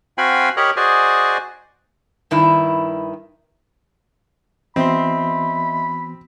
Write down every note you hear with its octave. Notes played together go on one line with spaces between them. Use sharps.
C4 F#4 F5 G5 G#5 B5
G4 A#4 C#5 D#5 A#5 B5
F#4 G#4 C5 D5 D#5 G#5
G2 D#3 E4
E3 B3 C4 F#4 D#5 E5 B5 C6